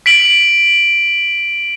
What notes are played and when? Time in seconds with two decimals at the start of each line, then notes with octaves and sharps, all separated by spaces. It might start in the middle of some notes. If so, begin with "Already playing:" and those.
0.06 B6 D7 F#7